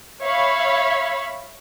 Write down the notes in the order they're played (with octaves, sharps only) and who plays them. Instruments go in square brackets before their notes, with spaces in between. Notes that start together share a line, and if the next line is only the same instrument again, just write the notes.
[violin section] C#5 E5 F5 B5